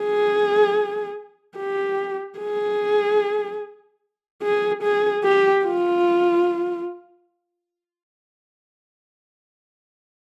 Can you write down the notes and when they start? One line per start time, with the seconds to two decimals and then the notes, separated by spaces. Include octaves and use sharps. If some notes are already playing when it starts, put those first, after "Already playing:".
Already playing: G#4
1.57 G4
2.38 G#4
4.43 G#4
4.83 G#4
5.23 G4
5.65 F4